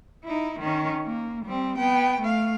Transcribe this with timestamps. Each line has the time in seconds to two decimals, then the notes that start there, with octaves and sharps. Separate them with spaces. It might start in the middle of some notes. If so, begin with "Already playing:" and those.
0.24 D#4 E4
0.60 D#3 C#4
1.06 A#3
1.45 G3 C4
1.78 B3 G5
2.21 A3 F5